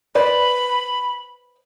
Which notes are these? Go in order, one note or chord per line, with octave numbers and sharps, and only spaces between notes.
B4 C5 D5 B5